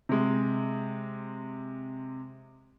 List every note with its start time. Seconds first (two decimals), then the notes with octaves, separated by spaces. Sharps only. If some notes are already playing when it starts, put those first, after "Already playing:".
0.09 C3 G#3